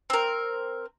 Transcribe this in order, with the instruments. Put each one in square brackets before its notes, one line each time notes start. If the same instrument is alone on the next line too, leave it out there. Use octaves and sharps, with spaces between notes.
[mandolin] C4 A#4